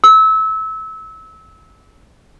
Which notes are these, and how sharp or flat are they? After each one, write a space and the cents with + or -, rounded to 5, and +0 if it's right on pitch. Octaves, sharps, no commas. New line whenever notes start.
E6 -25